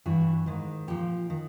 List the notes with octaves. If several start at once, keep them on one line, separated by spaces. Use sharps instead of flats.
G2 E3 F#4
G#2 D#3
A#2 F3 G4
D#3